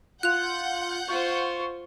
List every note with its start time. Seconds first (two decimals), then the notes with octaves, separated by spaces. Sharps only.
0.23 F4 F#5 F#6 G6 F7
1.08 F4 C5 C#6